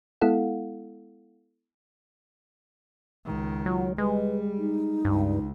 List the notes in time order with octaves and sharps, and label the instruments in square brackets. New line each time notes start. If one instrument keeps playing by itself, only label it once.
[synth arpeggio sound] G#3 B3 E4 A4 F5 F#5
[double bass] C#2 D#3
[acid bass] F#3 [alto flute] F4
[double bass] G3 [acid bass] G#3 [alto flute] B4
[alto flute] D#4
[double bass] C#2 [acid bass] G2